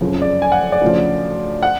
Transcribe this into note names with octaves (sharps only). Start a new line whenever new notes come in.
F#1 F2 C#3 F3
D5
G#5
F#5
D5
D2 C#3 F3
F#5